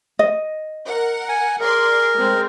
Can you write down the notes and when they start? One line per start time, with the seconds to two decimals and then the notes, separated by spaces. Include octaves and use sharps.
0.19 D#5
0.86 A#4 F#5
1.29 G#5
1.60 G#4 A#4 D5 C6
2.17 G#3 C4